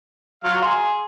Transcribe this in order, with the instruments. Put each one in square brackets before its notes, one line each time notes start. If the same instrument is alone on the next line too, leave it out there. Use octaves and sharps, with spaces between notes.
[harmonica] F#3 F4 F5
[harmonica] G#4 [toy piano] F5 A#5 C6